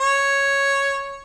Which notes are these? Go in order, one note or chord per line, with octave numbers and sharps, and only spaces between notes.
C#5